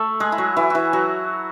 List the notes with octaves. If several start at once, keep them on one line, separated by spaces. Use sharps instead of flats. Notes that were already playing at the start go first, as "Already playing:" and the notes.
Already playing: A3 A4
G#3 G#4
E4
F#3 F#4
E3 E4
E3 E4 F#4
F#3 F#4